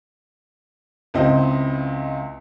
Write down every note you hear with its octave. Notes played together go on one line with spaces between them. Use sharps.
C#2 C4 E4 D#5